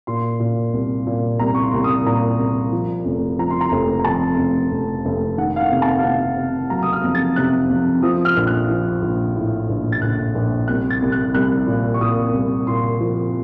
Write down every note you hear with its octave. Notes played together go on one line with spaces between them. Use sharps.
A#2 C6
A#2
C2
A#2
C2 A#5
C#6
C6
C2
D#6
A#2 A#5
C2
F3
F1
F3 A#5
C6
A#5
F1
A#5
F2 A5
F1
F1
F1
D#3 F#5
F5
F#5
C3
A5
F5
C3 F#5
C3
F#3 A#5
D#6
F6
F2
A6
C3 F#6
F2
F3 D#6
F6
A#1
F#6
F3
A#1
A2
A#1
A6
A#1 F#6
A#1
C2 F#6
A6
C2
F#6
C2 F#6
A#2
C#6
A#2 D#6
C2
A#2 C6
F3